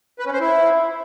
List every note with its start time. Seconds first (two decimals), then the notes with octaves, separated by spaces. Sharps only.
0.19 B4
0.26 C#4
0.33 C5
0.40 E4